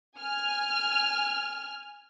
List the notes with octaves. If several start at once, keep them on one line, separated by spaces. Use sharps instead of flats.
G#5 F6